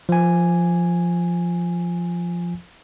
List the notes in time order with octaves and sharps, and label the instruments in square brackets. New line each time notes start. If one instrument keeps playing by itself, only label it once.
[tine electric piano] F3 G#5